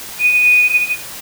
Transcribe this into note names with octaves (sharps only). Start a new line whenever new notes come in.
D#7